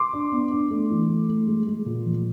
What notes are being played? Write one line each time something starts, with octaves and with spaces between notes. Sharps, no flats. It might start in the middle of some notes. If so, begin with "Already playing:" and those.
Already playing: C6 D6
D4
B3
D4
A3
E3
A3
A3
G#3
G#3
A#2
F3